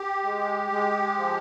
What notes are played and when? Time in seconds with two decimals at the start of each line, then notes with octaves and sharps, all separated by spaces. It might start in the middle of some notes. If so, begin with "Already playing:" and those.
Already playing: G4
0.24 G#3
0.71 G#3
1.18 F3